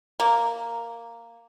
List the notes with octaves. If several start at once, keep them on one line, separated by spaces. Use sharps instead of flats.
A#3